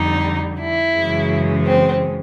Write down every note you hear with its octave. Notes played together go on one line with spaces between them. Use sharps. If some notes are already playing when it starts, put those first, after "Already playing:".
Already playing: F2 D3 G3 D#4
E4
F#2 C#3 E3 G#3
C4